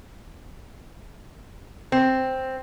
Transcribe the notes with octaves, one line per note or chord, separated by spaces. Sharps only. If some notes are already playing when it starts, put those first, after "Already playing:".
C4